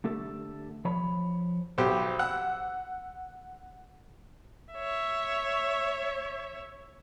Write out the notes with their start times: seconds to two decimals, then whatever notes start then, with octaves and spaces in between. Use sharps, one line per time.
0.04 D3 A3 G4 A4
0.85 F3 C#5 B5
1.78 B1 G4 C5
2.19 F#5 E6 F#6
4.74 C#5 E5